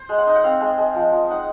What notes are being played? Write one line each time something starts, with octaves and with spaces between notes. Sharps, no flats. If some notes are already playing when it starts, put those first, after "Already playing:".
Already playing: C5
G#3
F#5
D#4
F#5
C4 F5
G#3
G#3
F3
F3
D#4 F#5